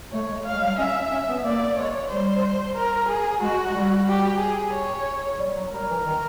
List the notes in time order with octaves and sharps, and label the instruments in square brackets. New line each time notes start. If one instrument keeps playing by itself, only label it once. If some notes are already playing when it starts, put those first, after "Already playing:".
[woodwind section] A3 [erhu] C#5
[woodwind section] G#3
[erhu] F5
[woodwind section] G#3
G3
[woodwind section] C#4 [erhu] E5
[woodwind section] C#4
B3
[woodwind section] A#3 [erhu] D5
[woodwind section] G#3 [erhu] C#5
[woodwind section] G3 [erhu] C5
[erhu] A#4
G#4
[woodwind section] G#3 [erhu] F#4
[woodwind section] G3
[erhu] G4
G#4
C#5
[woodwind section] G3
F#3
[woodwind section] G3 [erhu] A#4
[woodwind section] E3
D#3